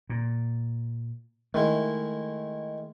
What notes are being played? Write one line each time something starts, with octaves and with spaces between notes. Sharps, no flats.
A#2
D#3 G#3 A3 E4